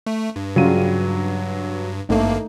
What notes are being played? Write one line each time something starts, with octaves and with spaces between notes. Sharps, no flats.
A3
G2
C#3 F#3 G3 F4 D#7
G#1 G2 A3 A#3 D#4